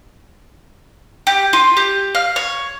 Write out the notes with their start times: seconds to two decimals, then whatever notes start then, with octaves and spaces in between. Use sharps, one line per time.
1.27 G4
1.53 F4
1.77 G4
2.15 F5
2.36 C#5